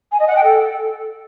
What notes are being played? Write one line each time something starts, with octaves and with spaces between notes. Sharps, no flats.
G#5
D#5
F#5
G5
A4